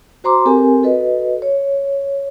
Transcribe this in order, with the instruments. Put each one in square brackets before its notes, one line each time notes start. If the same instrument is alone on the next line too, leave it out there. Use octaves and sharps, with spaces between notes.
[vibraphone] F#4 C5 A#5 C6 D6
C4 G4 A4 A#4 G#5
F#4 A4 B4 D#5
C#5